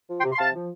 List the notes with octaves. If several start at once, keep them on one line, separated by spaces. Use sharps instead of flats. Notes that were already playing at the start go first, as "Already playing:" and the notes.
F3
G5 C6
C3
C6
C3 F5 A5
F3